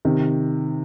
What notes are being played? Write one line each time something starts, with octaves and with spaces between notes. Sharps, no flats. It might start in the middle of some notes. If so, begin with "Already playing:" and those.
C3 D#3